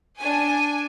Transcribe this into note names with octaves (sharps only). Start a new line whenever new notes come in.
D4 G#5